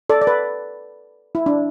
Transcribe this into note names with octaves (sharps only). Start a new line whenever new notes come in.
A4 D5
D5
B4
E4
D4